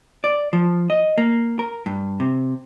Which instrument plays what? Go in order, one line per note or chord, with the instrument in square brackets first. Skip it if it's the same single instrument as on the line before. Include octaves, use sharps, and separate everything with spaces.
[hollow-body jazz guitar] D5
F3
D#5
A#3
A#4
G2
C3